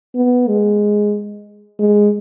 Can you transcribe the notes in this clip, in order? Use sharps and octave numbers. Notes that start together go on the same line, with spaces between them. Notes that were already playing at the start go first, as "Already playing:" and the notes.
B3
G#3
G#3